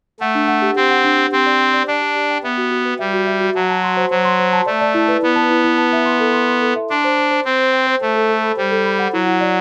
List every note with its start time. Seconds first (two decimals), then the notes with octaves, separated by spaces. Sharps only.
0.20 A3 F#5
0.35 D4
0.48 F#5
0.62 G4
0.76 C4 G4
0.90 F#5
1.04 D4
1.17 G4
1.32 C4 G4
1.46 D5
1.60 G5
1.73 D5
1.88 D4 D5
2.01 G4
2.16 G4
2.30 G5
2.44 B3 E5
2.57 F#4
2.71 F#4
2.85 B4
2.99 G3 E5
3.13 F#4
3.27 E5
3.41 F#4
3.55 F#3 A5
3.69 A5
3.83 C6
3.97 C5
4.11 F#3 C5
4.25 C6
4.39 C5
4.53 A5
4.66 A3 D5
4.81 D5
4.94 E4
5.08 B4
5.22 B3 E4
5.36 A5
5.50 E4
5.64 E4
5.78 A5
5.93 E5
6.06 C6
6.20 A4
6.33 C6
6.49 C6
6.62 A4
6.76 E5
6.90 D4 C6
7.04 C5
7.18 C5
7.31 C5
7.45 C4 C5
7.59 C5
7.73 G5
7.87 C5
8.01 A3 C5
8.15 A4
8.29 A4
8.44 B5
8.57 G3 C5
8.71 A4
8.85 B5
8.99 F#5
9.13 F#3 E4
9.27 E4
9.41 D5